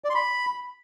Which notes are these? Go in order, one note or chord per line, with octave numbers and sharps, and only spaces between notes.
D5
C6
B5